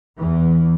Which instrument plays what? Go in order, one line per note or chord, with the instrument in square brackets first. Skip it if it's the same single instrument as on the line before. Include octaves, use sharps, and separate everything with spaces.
[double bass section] E2 E3